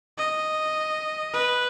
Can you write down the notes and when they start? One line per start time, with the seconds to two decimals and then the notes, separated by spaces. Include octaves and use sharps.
0.18 D#5
1.34 B4